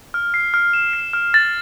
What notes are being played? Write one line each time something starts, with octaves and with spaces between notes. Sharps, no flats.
F6
C7
F6
E7
C7
F6
A6